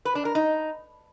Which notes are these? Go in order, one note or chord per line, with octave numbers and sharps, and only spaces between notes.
B4
D4
A#4
D#4